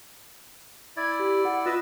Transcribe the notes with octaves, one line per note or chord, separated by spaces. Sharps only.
E4 D5 G#6
G4
F#5
F4 B4 D#5 E6